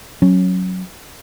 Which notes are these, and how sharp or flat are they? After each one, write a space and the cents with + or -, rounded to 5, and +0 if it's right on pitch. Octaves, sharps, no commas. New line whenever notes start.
F#3 +0 C#4 -10